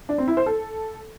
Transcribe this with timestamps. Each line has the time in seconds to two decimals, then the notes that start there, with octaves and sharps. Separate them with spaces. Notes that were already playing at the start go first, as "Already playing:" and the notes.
0.09 D4
0.18 C4
0.28 E4
0.37 C5
0.46 A4